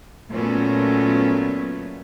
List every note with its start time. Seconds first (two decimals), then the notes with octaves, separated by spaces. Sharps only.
0.30 A#2 F#3 A3 B3 C#4